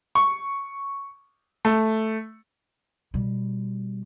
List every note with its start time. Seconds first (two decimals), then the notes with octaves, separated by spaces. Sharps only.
0.15 C#6
1.65 A3
3.14 B2 G3